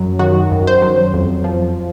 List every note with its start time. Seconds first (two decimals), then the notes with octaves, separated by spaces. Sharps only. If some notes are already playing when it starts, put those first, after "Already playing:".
Already playing: F#2 F#3
0.19 D#3 F#4
0.52 F#2
0.67 C5
0.82 F#3
1.14 F2
1.44 F3